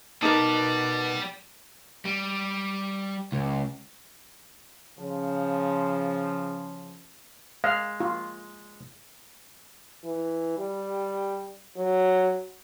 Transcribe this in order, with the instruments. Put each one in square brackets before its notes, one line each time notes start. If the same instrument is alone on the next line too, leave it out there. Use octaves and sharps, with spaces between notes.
[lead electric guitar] B2 B3 [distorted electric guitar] G3 [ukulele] D#4 A#4 [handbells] A5 D6
[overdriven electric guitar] G3
C#2
[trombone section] C#3 F3
[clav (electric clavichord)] G#3 [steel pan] F5
[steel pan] F4
[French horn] E3
G3
F#3